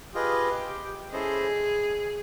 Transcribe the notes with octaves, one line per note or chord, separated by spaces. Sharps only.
F4 G4 G#4 B4 D#5
C#4 E4 G#4 A4 C5 D#5